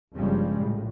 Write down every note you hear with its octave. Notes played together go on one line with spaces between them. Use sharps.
G1 G2 C#3 F3 G3 G#3
A#1 A2